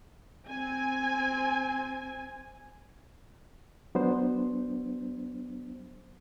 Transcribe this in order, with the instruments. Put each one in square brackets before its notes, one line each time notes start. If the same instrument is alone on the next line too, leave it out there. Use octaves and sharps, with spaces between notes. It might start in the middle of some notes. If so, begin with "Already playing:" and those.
[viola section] C4 G#5
[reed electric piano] F#3 B3 D4 C5